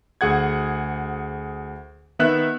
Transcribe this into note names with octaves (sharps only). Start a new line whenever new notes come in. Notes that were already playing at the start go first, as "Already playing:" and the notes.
D2 G#4 F#5 G#6
D#3 B3 E5 F#6